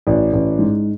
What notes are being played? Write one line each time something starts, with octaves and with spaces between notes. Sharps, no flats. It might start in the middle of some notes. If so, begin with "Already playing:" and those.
A1 D5
A1
G#2